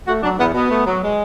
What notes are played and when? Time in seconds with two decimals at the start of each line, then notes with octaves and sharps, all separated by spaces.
0.07 A3 F#4
0.22 F#3 D4
0.39 E2 B3
0.54 B2 B3
0.70 A3
0.86 F#3
1.02 G#3